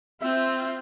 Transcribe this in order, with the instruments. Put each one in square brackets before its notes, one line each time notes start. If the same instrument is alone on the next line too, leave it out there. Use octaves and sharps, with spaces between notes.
[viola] C4 F4 [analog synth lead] E5